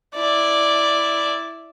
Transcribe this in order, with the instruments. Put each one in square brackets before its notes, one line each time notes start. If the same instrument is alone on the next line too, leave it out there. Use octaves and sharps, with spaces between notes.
[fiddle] E4 D5